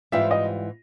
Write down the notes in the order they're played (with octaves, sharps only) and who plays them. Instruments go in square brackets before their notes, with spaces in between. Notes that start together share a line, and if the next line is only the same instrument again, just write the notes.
[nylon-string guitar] G#2 E3 G3 C4 F4 [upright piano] E5
[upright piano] D#5